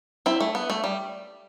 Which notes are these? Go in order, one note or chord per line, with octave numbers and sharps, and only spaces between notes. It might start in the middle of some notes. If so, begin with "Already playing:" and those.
C4 E4
A3
B3
A3
G3